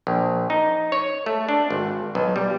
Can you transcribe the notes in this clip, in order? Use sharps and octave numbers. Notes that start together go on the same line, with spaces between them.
A#1
D#4
C#5
A3
D4
G#1
B1
G3